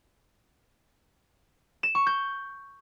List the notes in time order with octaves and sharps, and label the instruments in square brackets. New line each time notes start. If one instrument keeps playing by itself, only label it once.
[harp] E7
C#6
G6